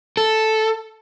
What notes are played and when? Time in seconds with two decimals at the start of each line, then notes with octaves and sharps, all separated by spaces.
0.17 A4